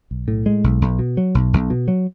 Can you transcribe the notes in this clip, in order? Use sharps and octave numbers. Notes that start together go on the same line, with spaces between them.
B1
A2
G#3
B1
B1
B2
F#3
B1
B1
B2
F#3